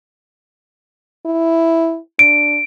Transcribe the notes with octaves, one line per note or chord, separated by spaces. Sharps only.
E4
D4 D7